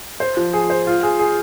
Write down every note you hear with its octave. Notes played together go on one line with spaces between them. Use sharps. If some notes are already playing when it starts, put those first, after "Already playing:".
C5
F3
G#4
C5
F4
G#4
G#4